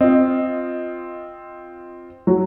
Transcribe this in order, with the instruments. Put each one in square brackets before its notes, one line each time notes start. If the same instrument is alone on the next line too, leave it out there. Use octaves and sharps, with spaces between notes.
[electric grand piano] C4 F4 [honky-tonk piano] D#5
[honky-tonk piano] F#3